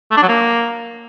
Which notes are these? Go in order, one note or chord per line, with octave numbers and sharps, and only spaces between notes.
A3
D4
F#3
A#3